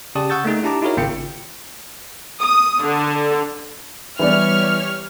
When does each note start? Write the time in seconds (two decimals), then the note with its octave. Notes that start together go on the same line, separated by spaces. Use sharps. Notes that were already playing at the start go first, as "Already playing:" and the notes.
0.15 C#3 G4 D5 A5 D#6
0.30 F#5 C#6 E6 G6 A6
0.44 A3 A#3 D#4 G#4
0.63 D4 E4 G4 A5 A#5 D6
0.82 D#4 E4 F#4 G#4 A#4 C#5
0.97 G#1 C#3 A#3 F4 G5 C#7
2.41 D#6
2.84 D3
4.19 E3 G3 B3 C#5 D5 F6